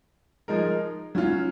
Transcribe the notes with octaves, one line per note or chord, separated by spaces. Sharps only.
F3 G#3 D#4 A#4
F#3 C#4 F4